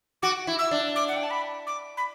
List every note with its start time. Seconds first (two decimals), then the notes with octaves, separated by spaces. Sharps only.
0.22 F#4 D6
0.47 E4
0.59 E6
0.71 D4
0.96 D6
1.08 F#5
1.16 G5
1.23 A5
1.31 B5
1.67 D6
1.97 B5